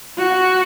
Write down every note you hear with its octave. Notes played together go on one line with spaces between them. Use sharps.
F#4